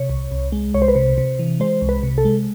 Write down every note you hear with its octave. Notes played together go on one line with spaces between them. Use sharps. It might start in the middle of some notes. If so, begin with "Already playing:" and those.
Already playing: C3 C#5
C2
C2
G#3
C2 C#5
C5
B4
C3 C5
C3
E3
G#3 C5
C2
B4
C3
A4
G#3